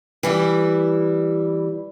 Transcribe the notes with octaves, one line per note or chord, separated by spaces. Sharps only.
E3 G3 E4